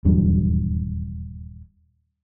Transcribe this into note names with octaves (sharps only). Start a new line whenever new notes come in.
D#1 E2 G2 F#3